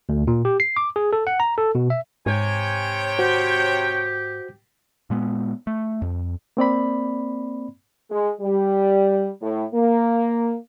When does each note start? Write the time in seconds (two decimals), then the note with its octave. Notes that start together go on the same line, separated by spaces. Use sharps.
0.09 D2
0.27 A#2
0.45 G4
0.60 C7
0.77 D6
0.96 G#4
1.13 A4
1.27 F#5
1.40 A#5
1.58 A4
1.75 B2
1.90 E5
2.26 G#2 C3 C#5 G5 G#5
3.19 F#4 G4 C5
5.10 A#2 G#3 B3
5.67 A3
6.02 F2
6.57 A#3 C4 D5 B5
8.11 G#3
8.41 G3
9.42 A2
9.74 A#3